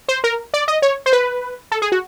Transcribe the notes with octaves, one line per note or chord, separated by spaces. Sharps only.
C5
A#4
D5
D#5
C#5
C5
B4
A4
G#4
F#4